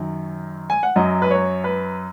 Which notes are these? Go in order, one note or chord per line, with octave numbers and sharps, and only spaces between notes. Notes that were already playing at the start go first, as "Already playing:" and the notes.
Already playing: F#2 D#3 F#3
G#5
F#5
F#2 F#3 D#5
B4
C#5
B4